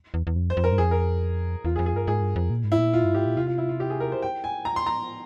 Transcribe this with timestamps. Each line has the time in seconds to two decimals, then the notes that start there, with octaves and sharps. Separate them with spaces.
0.14 E2
0.27 E2
0.36 F2
0.50 C5
0.57 F2
0.64 A#4
0.72 G2
0.78 F2 G#4
0.91 A#4
1.65 E2 F4
1.76 G#4
1.79 F2
1.86 G#4
1.94 G2 A#4
2.07 G#2 G#4
2.22 G2
2.36 F2
2.50 A#2
2.64 G#2
2.72 E4
2.78 A#2
2.93 F4
3.04 G2
3.14 G#2 G4
3.26 A#2
3.37 C3 F4
3.47 F4
3.58 E4
3.69 F4
3.80 G4
3.90 G#4
4.00 A#4
4.12 C5
4.22 G5
4.44 G#5
4.65 A#5
4.76 C6
4.86 A#5